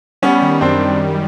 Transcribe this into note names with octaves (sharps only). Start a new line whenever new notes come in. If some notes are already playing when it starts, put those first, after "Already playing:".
G3 B3 C#4
D#3
F#2 C4 D4